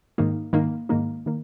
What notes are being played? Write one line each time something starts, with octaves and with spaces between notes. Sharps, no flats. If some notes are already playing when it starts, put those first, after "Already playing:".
G#2 D#3 A#3 D#4
G#2 D#3 A#3 D#4
G#2 D#3 A#3 D#4
D#3 A#3